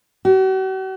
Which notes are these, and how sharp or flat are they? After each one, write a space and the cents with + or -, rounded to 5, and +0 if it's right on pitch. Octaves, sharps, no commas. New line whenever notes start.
F#4 +45